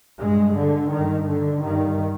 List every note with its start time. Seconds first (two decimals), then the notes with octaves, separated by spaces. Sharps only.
0.21 G2 G#3
0.57 D3
0.92 G2 D#3
1.28 D3
1.64 G2 D#3